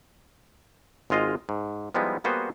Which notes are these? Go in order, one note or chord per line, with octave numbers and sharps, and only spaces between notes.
G#1 G#3 F4 D#5 F5
G#2
F3 G3 G#3 B3 D#4 E4
G3 A#3 B3 F#4 G#4 C5